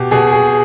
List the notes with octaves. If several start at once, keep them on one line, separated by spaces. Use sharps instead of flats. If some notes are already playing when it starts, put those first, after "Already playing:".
Already playing: B2 G4
B2 G#4
G#4